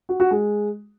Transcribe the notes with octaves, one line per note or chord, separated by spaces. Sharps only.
F#4
F#4
G#3